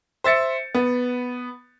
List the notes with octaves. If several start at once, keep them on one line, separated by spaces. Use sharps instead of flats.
C5 E5 A6 C#7
B3